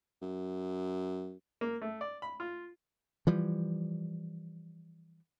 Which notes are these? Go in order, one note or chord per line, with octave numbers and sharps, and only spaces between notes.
F#2
A#3
A3
D5
B5
F4
E3 F3 G3